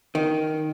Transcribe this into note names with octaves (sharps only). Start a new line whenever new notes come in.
D#3